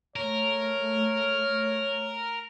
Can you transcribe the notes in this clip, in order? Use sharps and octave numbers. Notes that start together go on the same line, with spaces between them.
A3 A#4 C#5